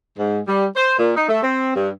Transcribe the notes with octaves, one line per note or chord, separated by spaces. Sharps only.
G#2
G3
C5
A#2
D#4
A3
C4
G2